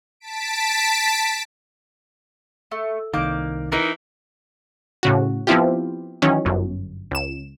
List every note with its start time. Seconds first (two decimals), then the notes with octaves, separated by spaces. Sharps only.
0.20 A5 B6 D7
2.71 A3
3.14 C2 D#3 A#3 D6 G6
3.72 E3 D#4 A#4
5.03 A2 C#3 F#4
5.47 F3 B3 C4 E4 F4 G4
6.22 D#3 E3 F#3 C#4
6.45 G1 F#2
7.11 C#2 E7